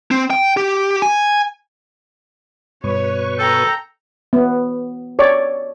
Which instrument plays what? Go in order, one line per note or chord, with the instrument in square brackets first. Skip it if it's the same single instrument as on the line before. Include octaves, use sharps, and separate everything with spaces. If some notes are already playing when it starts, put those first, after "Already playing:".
[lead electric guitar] C4
G5
G4
G#5
[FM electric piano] G2 [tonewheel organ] B2 B4 C#6 [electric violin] C#5
[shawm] A4 [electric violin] G5 A#5
[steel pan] B3
C#5 D5